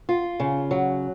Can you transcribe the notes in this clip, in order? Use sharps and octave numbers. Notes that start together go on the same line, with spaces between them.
F4
C#3
F#3